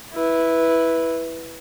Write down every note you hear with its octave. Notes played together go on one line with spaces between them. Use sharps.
E4 B4